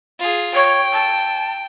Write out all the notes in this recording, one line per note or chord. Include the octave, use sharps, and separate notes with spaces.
F4 G#4
C#5 G5
A5